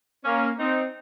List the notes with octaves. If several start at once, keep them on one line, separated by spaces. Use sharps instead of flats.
A#3 C#4
C4 D#4